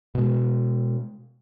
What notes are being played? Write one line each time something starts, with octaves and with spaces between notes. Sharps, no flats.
B2 G#3